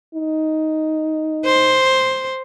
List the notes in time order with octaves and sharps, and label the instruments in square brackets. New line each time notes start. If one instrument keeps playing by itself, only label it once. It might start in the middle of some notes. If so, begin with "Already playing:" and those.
[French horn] D#4
[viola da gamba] C5